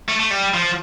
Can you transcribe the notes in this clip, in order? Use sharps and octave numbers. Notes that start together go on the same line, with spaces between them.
A3
A3
G3
F3